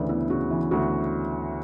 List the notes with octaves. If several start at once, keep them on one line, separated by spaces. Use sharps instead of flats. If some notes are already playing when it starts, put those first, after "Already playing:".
Already playing: D2 C#3 E3 B4 D5
B3 E4
C#3 F#4
E3
D2 F#4